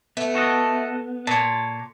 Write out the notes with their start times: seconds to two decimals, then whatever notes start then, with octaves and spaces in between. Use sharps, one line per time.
0.17 A3 B3
0.35 F#4 A4 D#5
1.27 A#2 C#5 A5